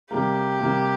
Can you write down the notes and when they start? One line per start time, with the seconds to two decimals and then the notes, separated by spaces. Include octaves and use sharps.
0.11 C3 G3 A#3 G4
0.59 C3 G3 A#3